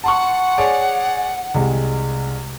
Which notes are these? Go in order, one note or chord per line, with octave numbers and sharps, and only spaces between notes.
F#5 A5 C6 C#6
G#4 C#5 D5
C2 C3 G#3